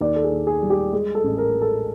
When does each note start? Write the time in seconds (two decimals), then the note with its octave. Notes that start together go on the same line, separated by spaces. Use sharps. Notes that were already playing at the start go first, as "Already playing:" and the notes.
0.01 D#2 D5
0.16 A4
0.24 G#4
0.31 D#2
0.47 G#4
0.62 G3
0.70 G4
0.93 G#3 G#4
1.15 A4
1.24 A1
1.38 A#4
1.53 G#3
1.62 A4